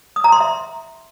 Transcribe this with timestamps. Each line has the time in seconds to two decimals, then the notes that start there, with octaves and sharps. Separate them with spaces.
0.16 D#6
0.24 A#5
0.32 C6
0.40 E5